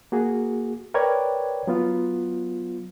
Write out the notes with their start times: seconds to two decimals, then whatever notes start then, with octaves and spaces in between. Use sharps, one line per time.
0.12 A#3 F#4 G#4
0.94 A#4 B4 C#5 D5 G5 G#6
1.67 F#3 B3 F4